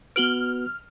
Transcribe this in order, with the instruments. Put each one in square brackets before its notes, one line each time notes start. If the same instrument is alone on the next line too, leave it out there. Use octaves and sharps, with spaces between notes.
[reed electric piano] B3 F#4 B4 [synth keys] F6 [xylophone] D7 F#7 G7